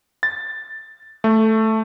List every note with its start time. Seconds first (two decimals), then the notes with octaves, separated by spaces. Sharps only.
0.23 A6
1.24 A3